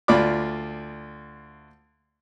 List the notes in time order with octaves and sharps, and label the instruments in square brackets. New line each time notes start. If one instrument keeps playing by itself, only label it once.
[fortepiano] D2 F4 D5 B5 D6